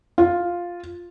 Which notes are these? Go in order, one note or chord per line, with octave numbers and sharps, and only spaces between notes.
F4